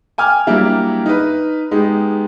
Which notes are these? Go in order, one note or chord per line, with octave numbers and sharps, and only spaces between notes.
G5 G#5 D6 F6
F#3 G3 A#3 D4 E4 G4
D#4 B4
G#3 B3 D#4 G4